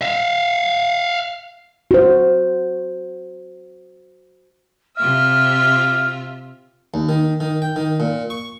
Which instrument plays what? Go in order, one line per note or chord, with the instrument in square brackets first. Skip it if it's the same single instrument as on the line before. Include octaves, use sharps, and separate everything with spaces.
[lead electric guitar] E5 F5
[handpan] F#4 C5
[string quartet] C3 F4 E5 [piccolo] F6
[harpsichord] D#2
D#3
D#3
G5
D#3
A#2
C#6